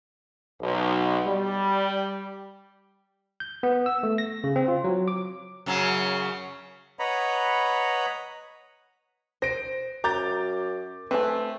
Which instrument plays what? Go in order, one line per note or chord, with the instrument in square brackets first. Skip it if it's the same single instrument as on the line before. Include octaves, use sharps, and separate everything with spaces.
[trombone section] B1
G3
[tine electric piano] G6
B3
E6
A3
A#6
C#3
C4
F4
F#3
D6
[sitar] F#2 C#3 F#3
[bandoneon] B4 C#5 D#5 F#5 A#5 B5
[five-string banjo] C5 [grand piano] A#6 D7
[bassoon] F#2 [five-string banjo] A#5 [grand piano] D6 G6 A6
[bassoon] A3 [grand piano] C4 [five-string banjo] B4 G#5